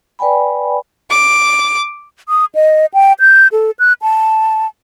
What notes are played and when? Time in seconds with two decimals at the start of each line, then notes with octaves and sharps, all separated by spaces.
0.19 B4 D5 G5 G#5 B5
1.10 D6
2.29 D#6
2.55 D#5
2.94 G5
3.20 G6
3.52 A4
3.79 F#6
4.02 A5